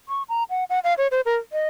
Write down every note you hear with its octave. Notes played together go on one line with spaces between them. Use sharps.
C#6
A#5
F#5
F#5
F5
C#5
C5
A#4
D#5